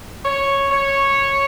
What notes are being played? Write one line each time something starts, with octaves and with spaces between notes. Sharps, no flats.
C#5
C#5